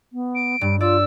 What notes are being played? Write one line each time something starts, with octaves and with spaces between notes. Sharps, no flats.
B3
D7
G2 G3
F4 D5 E6